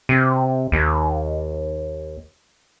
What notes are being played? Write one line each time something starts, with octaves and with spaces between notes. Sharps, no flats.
C3
D#2